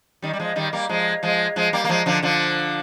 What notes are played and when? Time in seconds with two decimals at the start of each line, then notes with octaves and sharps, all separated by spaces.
0.22 D#3 G3
0.33 G3
0.40 F3 G#3
0.56 D#3 G3
0.73 G3 A#3
0.89 F3 G#3
1.23 F3 G#3
1.56 F3 G#3
1.73 G3 A#3
1.84 A#3
1.89 F3 G#3
2.06 D3 F3
2.23 D3 F3